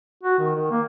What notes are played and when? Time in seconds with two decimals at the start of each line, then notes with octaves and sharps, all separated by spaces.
0.23 F#4
0.39 D#3
0.55 D#3
0.71 A#3